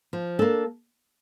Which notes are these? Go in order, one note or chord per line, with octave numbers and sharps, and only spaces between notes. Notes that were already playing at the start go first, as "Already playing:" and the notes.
F3
A#3 D4 A4